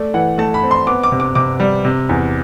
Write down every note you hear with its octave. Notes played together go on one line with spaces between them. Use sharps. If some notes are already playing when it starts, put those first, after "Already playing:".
Already playing: A3 D5
E3 F#5
A3 A5
B5
C4
C6
B3 D6
D6
C3
D6
C3 D6
G3
C3
E2